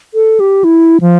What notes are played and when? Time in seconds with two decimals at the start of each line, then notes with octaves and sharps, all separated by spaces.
0.14 A4
0.40 G4
0.64 E4
1.01 F3